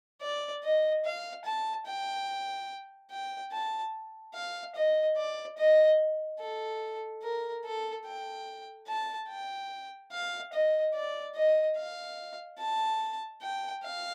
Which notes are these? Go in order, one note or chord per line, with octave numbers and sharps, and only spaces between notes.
D5
D#5
F5
A5
G5
G5
A5
F5
D#5
D5
D#5
A4
A#4
A4
G5
A5
G5
F5
D#5
D5
D#5
F5
A5
G5
F5